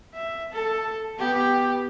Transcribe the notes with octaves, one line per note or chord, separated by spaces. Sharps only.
E5
A4
B3 G4